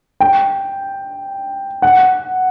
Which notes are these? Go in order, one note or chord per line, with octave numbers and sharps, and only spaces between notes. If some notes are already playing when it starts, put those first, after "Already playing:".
G5
F#5